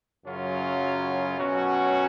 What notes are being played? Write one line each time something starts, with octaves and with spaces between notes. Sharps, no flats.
F#2 C#3 F#3 C#4 F4
B2 F#3 C#4 F#4